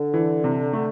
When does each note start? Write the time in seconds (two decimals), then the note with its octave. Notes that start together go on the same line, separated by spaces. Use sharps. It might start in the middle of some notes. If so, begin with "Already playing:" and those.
Already playing: D3
0.14 E3
0.44 C3
0.73 A3